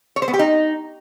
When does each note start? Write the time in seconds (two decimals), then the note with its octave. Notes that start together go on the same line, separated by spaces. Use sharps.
0.16 C#5
0.22 C5
0.28 B3
0.34 G4
0.39 D#4